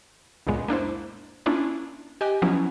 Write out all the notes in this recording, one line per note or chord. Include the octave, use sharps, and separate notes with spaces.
C#2 F#2 A#2 G#3 B3
A#3 D4 E4 C5
A#3 C#4 D4 E4 F4
G4 D#5 G5 G#5 F#6
F3 F#3 B3 C#4 E4